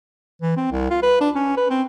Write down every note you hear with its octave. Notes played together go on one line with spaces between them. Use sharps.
E3
C4
C2
F4
B4
D4
C#4
B4
C4